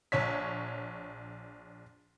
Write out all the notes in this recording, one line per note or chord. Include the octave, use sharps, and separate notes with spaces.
A#1 C#5 B6